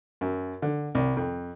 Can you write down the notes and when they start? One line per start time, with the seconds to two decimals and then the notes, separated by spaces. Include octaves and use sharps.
0.21 F#2
0.62 D3
0.95 C2
1.17 F2